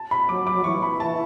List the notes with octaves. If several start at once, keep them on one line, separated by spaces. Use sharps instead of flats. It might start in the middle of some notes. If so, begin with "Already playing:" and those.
Already playing: A5
B5
F#3 D6
D6
F#3
E3 C#6
B5
A5